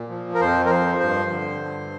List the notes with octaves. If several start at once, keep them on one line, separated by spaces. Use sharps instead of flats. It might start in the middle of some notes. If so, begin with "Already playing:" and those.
Already playing: A#2
F3
A#4
F2 C5
A#4
F3 C5
G2 C5
D3
G2